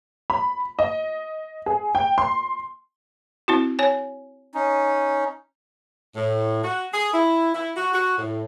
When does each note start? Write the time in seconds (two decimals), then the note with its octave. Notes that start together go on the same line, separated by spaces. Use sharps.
0.30 B5
0.79 D#5
1.66 G#4
1.95 G5
2.18 C6
3.48 C4 E4 F#4
3.79 C#5 G#5
4.54 C#4 D#4
6.16 A2
6.64 F#4
6.94 G#4
7.14 E4
7.55 E4
7.77 F#4
7.94 F#4
8.18 A2